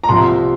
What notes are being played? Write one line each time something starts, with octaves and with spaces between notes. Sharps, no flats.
A#5
C2 C3 F3 C6